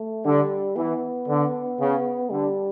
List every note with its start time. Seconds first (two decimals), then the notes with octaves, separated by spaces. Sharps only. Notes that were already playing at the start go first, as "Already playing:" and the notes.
Already playing: A3
0.24 D3 G3
0.76 E3 B3
1.27 D3
1.79 C#3
2.30 D3 G3